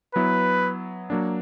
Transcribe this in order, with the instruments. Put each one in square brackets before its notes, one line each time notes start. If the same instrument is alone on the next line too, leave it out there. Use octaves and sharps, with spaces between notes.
[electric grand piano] F#3 B3 E4 [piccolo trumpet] B4
[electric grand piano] F#3 A#3 D4